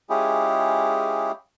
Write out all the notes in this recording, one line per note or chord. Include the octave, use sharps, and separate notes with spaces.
G#3 C#4 E4 F4 G4 G#4